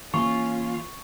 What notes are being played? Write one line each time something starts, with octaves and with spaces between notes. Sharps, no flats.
E3 A#3 C#4 F4 C#6